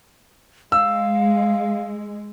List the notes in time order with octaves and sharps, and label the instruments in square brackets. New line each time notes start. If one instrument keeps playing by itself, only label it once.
[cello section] G#3 [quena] F5 [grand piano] E6